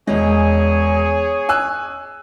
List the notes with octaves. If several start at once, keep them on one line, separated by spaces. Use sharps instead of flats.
E1 G#3 G#4 C#5
G#5 E6 F#6